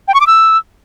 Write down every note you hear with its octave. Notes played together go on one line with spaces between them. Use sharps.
G5
C#6
D6
E6